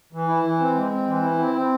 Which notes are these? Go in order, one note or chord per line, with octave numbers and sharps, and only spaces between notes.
E3
E4
E3
C4
G#3
C4
E3
E4
C4
C4